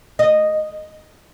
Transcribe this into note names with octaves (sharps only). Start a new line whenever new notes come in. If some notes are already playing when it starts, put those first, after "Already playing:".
D#5